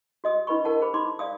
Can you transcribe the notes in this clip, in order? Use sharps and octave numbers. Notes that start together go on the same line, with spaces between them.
F#4 D#5 D#6
D4 E4 B4 D#5 B5 C#6
A#4 D#5 F#5 A5
G#4 C5 B5
D#4 B5 C6 D6
D5 F5 D#6